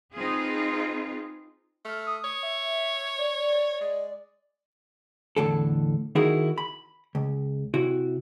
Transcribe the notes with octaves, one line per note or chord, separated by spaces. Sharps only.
C4 D#4 F4 G#4 B4
A3 F6
D#6
C#5
E5
D5
G#3
E2 A2 D3 A4
D#3 D#4 E4 F#4 G#4 A#4
B5
C#2
C3 E4 F#4